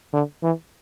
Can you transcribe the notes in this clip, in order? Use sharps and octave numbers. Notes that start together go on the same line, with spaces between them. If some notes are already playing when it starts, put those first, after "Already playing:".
D3
E3